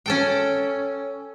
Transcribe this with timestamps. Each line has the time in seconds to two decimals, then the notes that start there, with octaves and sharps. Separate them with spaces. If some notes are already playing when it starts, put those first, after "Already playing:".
0.06 C#4 A4 G5